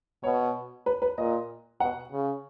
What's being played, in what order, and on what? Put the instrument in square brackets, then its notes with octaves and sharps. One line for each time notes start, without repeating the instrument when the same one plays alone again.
[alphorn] B2 [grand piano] C#5
[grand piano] B4
B4
[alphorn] A#2 [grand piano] D#5
[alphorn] B2 [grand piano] F#5
[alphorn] C#3